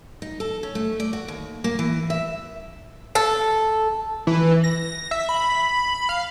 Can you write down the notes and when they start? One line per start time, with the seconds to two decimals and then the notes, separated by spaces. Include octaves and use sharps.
0.22 D#4
0.40 A4
0.63 C#4
0.75 A3
1.00 D5
1.13 F#4
1.28 D#2
1.64 A#3
1.79 E3
2.10 E5
3.15 A4
4.27 E3
4.64 A#6
5.11 E5
5.29 B5
6.09 F5